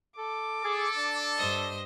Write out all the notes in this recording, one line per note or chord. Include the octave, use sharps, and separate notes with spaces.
A4 D6
G#4 A4
D4
G2 C5 D#5